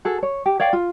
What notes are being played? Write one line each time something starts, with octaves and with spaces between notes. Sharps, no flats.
F#4 G#4 A4
C#5
G4
C#5 D5 F5 G5
F4